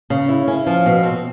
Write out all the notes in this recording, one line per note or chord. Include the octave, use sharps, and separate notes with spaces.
C#3
E4
C#4
F3
B2
C4